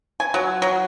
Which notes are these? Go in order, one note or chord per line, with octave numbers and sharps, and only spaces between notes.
G#5
F#3
F#3